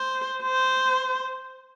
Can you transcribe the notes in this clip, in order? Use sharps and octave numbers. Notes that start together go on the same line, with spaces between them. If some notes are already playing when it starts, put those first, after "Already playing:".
Already playing: C5
C5